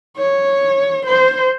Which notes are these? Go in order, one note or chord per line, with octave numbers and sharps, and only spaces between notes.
C#5
C5